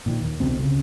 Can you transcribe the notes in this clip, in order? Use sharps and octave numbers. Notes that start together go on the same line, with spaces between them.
A#2 D#3 F3
D#2
C2 B2 D3 C4
C#2 C#3